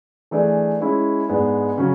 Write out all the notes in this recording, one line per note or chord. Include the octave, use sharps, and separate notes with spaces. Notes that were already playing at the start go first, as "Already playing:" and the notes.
E3 A3 D4 G#4 D5
G#3 C#4 E4
G#2 G#3 B3 D4
C#3 F#3 C#4